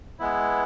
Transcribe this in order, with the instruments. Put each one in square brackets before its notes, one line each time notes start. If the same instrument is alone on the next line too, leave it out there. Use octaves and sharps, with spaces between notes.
[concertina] G#3 B3 E4